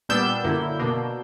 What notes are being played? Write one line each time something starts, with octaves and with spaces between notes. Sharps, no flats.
A#2 G3 B3 D4 E6 G6
F#2 D3 A#3 E4
B2 A#3 D4